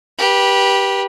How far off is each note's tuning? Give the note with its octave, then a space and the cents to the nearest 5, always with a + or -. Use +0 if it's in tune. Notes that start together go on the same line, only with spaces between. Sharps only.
G4 +0 B4 -25